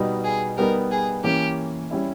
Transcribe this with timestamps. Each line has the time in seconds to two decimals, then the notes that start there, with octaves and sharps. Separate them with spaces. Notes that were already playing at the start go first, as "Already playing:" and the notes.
Already playing: B2 G3 B3 D#4
0.24 G#4
0.57 G3 B3 D#4 A#4
0.91 G#4
1.24 E3 A#3 C#4 G4
1.91 G3 C#4 E4